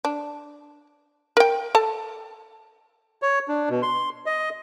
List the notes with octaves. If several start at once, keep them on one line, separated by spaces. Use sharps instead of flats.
D4
A#4 G5
A4 A5
C#5
D4
B2
C6
D#5